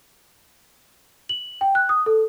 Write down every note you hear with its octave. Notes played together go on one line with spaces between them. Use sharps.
F#7
G5
F#6
D#6
A4